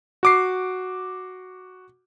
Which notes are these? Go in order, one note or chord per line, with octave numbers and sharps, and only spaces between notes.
F#4 D6 C7